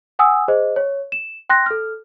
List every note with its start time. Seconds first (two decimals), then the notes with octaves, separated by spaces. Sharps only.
0.19 F#5 G#5 D#6 E6
0.48 G#4 C5 D#5
0.76 C#5
1.12 E7
1.50 G5 C6 F#6 A#6
1.66 A4 F6